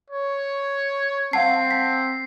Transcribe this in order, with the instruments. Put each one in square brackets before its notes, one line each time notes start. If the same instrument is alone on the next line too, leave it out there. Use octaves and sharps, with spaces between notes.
[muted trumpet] C#5
[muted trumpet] C4 [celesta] F5 F#5 A5 [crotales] C7
[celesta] B6